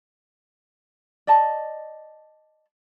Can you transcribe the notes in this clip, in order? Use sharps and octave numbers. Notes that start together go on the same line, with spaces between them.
D5 D#5 A5